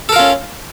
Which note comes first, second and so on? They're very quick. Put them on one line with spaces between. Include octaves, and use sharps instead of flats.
A4 A#4 F4 C#4